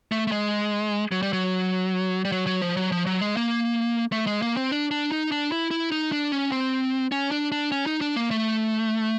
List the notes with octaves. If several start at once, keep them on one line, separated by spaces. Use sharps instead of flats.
A3
A3
G#3
F#3
G3
F#3
G3
F#3
F#3
F3
F#3
F3
F#3
G#3
A#3
A3
G#3
A#3
C4
D4
D4
D#4
D4
E4
E4
D#4
D4
C#4
C4
C#4
D4
D4
C#4
D#4
D4
A#3
A3